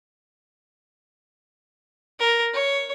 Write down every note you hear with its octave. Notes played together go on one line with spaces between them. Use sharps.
A#4
C#5